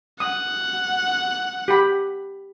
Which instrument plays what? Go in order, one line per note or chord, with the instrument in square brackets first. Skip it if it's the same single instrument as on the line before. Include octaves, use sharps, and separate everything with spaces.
[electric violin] F#5 [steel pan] D#6
[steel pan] G4 B5